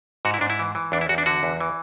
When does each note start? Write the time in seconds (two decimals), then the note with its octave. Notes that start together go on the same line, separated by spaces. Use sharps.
0.25 G#2 F#4
0.34 E4
0.41 G#2 D4
0.50 E4
0.59 E3
0.75 E3
0.92 E2 D4
1.01 E4
1.09 E2 F#4
1.18 D4
1.26 D3 F#4
1.43 E2
1.60 E3